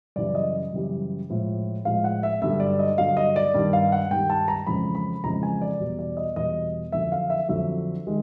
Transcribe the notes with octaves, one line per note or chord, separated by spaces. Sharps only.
F#2 C#3 E3 G3 D5
D#5
F#2 C#3 E3 G3
A2 F3 G#3
A2 F3 G#3 F5
F#5
E5
G2 D3 F#3 E5
D5
D#5
G2 D3 F#3 F5
D#5
D5
G2 D#3 G3
F5
F#5
G2 D#3 G3 G5
A5
A#5
F2 C#3 E3 G#3 B5
B5
F2 C#3 E3 G#3 A#5
G#5
D5
E2 B2 G3
D5
D#5
E2 B2 G3 D#5
F2 D3 F#3 E5
F5
E5
F2 D3 F#3 E5
D#3 G#3